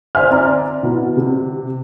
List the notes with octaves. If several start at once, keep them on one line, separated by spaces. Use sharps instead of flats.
C5 D5 E5 G#5 F6
C4 D5 A#5
B2 E4
C3